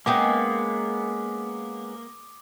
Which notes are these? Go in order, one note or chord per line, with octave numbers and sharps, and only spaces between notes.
G#3 A#3 B3 C#4 D#5 G5 D6 D#6